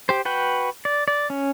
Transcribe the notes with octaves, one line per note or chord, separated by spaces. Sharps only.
G4 C5
F#4 B4 G5
D5
D5
C#4